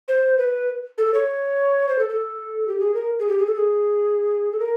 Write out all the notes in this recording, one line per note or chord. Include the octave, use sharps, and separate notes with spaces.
C5
B4
A4
C#5
C5
A4
A4
G4
G#4
A#4
G#4
G4
G#4
A4
G#4
A4
A#4